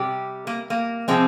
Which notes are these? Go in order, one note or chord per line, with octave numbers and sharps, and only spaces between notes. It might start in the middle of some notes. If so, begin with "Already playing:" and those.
Already playing: C3 G3 G4
A#3
A#3
C3 F3 G#3 C4